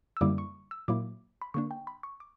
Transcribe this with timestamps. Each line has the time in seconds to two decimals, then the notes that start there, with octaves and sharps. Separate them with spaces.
0.17 E6
0.21 F#2 D3 G3 A#3 E4 D6
0.38 C#6
0.71 E6
0.88 A#2 F#3 A#3 E4 D6
1.42 B5
1.54 D3 A#3 D4 C#6
1.71 G5
1.87 B5
2.03 C#6
2.20 D6